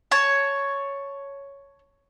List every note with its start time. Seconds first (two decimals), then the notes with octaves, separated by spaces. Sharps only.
0.11 C#5 A5